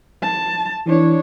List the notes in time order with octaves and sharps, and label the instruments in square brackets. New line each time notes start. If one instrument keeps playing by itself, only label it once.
[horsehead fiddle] A5
[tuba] E3 [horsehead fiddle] D4 C#5